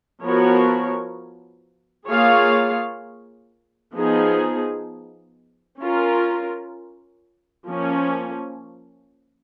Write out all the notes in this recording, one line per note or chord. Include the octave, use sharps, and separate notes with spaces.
F3 B3 F#4 A#4 C#5
A#3 F4 G#4 C#5 F5
F3 B3 D#4 G#4
C#4 F4 A#4
F3 A#3 C#4